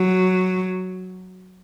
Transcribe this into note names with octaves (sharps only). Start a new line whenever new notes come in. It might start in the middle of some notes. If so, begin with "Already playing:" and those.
Already playing: F#3